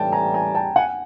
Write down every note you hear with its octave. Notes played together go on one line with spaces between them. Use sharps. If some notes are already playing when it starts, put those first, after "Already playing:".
Already playing: A1 A2 E3 G3 G5 A5
G#5 A#5
G#5 A#5
G5 A5
F#5 G#5